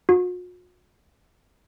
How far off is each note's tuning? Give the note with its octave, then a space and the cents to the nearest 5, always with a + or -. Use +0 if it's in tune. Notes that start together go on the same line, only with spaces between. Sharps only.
F#4 -45